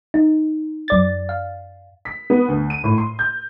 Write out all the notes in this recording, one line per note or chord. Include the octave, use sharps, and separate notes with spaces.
D#4
F#2 D5 A6
F5
B6
B3
D2
D#7
A2
C6
G6